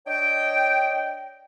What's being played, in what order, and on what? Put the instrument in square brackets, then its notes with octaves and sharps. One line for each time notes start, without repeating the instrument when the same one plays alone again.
[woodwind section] D4 C#5 D#5 G5